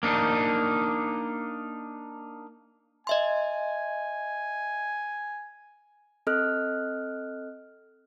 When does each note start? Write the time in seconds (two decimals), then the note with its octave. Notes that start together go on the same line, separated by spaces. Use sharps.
0.03 A#3 D4 D#4
3.07 D#5 E5 G#5 C6
6.27 C4 A4 D#5 F6 F#6